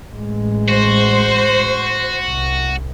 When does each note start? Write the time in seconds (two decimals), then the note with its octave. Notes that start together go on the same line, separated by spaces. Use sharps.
0.14 A1 G#3
0.68 F#4 C5
2.27 C2